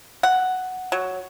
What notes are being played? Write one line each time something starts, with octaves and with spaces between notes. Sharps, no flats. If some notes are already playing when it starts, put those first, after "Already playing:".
F#5
F#3